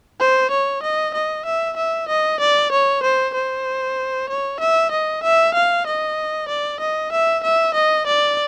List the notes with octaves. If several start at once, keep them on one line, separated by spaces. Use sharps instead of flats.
C5
C#5
D#5
D#5
E5
E5
D#5
D5
C#5
C5
C5
C#5
E5
D#5
E5
F5
D#5
D5
D#5
E5
E5
D#5
D5